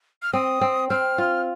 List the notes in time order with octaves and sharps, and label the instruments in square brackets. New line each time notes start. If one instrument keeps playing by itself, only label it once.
[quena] F6
[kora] C4 [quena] D#6
[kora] C4
[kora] C4 [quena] F6
[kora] F4